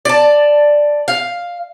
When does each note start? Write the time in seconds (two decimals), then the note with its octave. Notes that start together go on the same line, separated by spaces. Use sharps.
0.05 D5 A5
1.08 F5